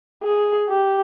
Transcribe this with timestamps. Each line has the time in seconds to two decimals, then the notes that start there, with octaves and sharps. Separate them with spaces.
0.23 G#4
0.69 G4